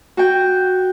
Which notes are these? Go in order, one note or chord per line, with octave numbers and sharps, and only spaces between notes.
F#4 G5